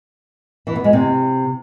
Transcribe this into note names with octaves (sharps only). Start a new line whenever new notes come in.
E3
B3
G#3
C3